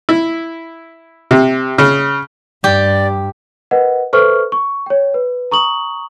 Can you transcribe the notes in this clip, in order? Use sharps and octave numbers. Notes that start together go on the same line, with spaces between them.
E4
C3
C#3
G2 G4 D5
A#4 B4 D#5 F#5
A4 B4 C5 E5 C#6 F6
C#6
C#5 G5
B4
A#5 C#6 D#6 F#7